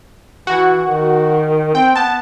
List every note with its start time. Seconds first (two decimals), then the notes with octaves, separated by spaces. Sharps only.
0.47 E3 F#4
0.85 D#3
1.75 C4 G5
1.95 B3 A5